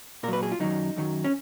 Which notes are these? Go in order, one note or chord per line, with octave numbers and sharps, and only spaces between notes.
A#2 F#3 A#4 B4
G#4
F4
F#2 D#3 F#3 D#4
F#2 D#3 F#3
C#4